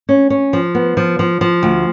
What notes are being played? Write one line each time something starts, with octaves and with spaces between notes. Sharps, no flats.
C#4
C#4
F3
B3
F3
F3
F3
D2